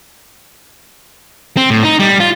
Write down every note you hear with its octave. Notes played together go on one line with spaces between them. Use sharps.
C4
A2
D#4
G3
F4